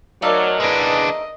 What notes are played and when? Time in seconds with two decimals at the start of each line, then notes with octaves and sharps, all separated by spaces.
0.22 F#3 A3 D#4 A#4 D5 F5
0.60 E3 G#3 D4 G#4 B4 D#5